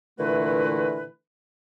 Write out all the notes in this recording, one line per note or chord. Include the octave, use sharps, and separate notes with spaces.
A#2 D3 E3 A3 F#4 B4